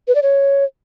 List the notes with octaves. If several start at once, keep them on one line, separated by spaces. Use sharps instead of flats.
B4
D5
C#5